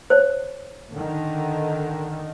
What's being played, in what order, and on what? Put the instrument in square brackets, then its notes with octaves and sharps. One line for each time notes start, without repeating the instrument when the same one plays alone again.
[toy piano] C5 C#5
[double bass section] D3 D#3